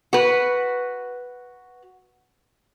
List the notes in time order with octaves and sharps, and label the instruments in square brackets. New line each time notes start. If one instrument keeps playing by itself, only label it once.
[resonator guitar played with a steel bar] F#4 B4